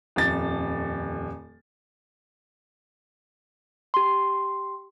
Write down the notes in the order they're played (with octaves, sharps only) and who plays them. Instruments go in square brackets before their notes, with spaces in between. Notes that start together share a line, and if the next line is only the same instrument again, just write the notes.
[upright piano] D#1 F2 A6
[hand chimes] G4 C6